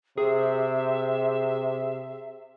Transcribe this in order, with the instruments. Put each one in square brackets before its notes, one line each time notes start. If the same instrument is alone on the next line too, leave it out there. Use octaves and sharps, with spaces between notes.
[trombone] C3 [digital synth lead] G#4 [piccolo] E5